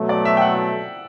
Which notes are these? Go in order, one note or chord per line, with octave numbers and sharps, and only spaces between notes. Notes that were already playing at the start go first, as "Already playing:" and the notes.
Already playing: B2 F#3 A3
D5
E5
G5
F#5